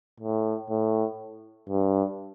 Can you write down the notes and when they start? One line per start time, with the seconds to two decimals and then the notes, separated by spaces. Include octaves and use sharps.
0.20 A2
0.70 A2
1.69 G2